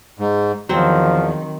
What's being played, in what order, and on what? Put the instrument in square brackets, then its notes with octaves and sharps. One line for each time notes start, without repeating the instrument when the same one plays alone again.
[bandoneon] G#2
[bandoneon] E2 [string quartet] D#3 [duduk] F3 [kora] F#3 C4